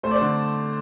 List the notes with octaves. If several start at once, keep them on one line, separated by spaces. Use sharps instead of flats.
A3 C5
D5
C5
D3